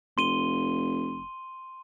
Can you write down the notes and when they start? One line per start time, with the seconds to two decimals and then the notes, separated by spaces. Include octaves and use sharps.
0.18 F1 C6 D#7 G7